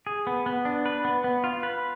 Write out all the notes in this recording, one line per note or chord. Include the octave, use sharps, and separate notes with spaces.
G#4
B3
B3
D4
B4
B3
B3
F4
B4